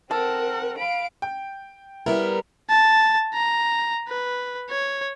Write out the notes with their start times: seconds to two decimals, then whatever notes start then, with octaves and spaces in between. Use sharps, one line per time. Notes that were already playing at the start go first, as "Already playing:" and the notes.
0.11 C4 A4 A#4 F#5
0.78 F5 B5 D7
1.22 G5
2.06 G3 B3 E4 A#4
2.69 A5
3.34 A#5
4.08 B4
4.70 C#5